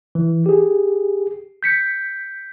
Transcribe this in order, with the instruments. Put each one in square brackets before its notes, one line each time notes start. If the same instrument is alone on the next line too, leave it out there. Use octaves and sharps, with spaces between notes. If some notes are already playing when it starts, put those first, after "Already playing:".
[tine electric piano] E3
G4 G#4
G6 B6 C#7